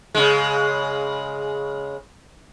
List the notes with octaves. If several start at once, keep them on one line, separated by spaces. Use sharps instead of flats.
C#3 G#3